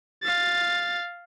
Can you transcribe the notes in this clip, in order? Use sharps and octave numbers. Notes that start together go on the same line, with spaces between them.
F5 A6